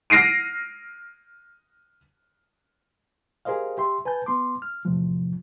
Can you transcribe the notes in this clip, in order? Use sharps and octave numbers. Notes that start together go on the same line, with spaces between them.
F6 A#6 C7 D7 D#7
G4 G#4 A#4 C5 D#5 F5
G4 E5 C6
B4 G#5 A5 G6
B3 C6 D6
F6
E2 A2 C3 F3